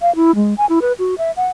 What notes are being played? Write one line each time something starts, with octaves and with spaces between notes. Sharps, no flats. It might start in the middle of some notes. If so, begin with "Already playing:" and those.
F5
E4
G#3
G#5
E4
B4
F#4
E5
F#5